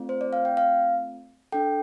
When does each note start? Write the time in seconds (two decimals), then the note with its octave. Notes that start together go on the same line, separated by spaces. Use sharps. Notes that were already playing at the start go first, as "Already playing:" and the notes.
Already playing: A3 C4 F4
0.09 C5
0.21 D5
0.33 F5
0.45 G5
0.57 F5
1.52 D4 A4 G5